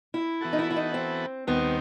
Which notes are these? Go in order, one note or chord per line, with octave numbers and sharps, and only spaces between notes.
E4
E3 B3 F#4 A4
D#4
E4
E4
D#4
C4
D#2 D#3 G3 B3 C4